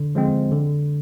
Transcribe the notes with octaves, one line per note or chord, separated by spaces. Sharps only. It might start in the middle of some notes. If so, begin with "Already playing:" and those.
Already playing: D3
F3 G#3 C4
D3